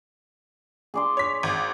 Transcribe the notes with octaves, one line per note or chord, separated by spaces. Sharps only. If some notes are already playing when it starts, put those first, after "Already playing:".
G#4 D5 C6
C#5 B6
G#1